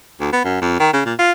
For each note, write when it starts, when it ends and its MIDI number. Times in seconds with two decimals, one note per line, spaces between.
0.20 0.28 38
0.33 0.41 59
0.44 0.58 42
0.61 0.77 41
0.80 0.91 51
0.93 1.01 49
1.05 1.13 46
1.19 1.31 65